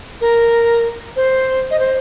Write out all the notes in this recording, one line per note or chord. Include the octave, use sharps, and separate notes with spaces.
A#4
C5
D#5
C5